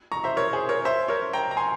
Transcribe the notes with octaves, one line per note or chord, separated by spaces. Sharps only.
A#5 C#6
C5 E5
A#4 C#5
G#4 C5
A#4 C#5
C5 E5
A#4 C#5
G5 A#5
A#5
G#5 C6